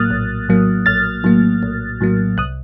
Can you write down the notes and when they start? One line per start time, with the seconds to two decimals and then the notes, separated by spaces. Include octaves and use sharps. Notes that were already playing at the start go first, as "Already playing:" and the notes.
Already playing: A#1 A2 F#3 A#3 D#6 F6 F#6 A6
0.10 A#1
0.49 A2 F#3 A#3
0.86 A#1 F6 A6
1.24 A2 F#3 A#3
1.63 A#1
2.01 A2 F#3 A#3
2.38 C2 D#6 F#6